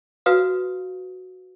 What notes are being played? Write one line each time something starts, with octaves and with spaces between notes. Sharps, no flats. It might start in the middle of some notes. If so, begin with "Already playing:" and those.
F#4 B4 F5 D#6